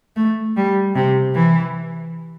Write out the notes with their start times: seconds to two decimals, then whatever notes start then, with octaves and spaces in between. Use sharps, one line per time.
0.16 A3
0.57 G3
0.95 C3
1.34 E3